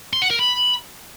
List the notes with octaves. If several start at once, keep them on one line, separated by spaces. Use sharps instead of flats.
C6
F#5
A#4
B5